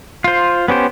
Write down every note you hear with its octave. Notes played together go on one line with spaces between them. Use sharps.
F4 C5
B3 C#4 G4 C5